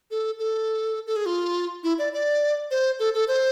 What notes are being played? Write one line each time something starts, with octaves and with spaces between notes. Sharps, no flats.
A4
A4
A4
G#4
F4
E4
D5
D5
C5
A4
A4
C5